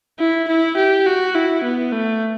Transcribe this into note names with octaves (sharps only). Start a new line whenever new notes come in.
E4
E4
G4
F#4
E4
B3
A3